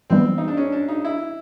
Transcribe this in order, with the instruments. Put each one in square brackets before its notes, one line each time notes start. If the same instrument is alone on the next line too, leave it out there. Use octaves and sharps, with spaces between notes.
[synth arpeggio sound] E3 G3 B3 [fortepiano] C4
[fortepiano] D#4
D4
C#4
D4
D#4
E4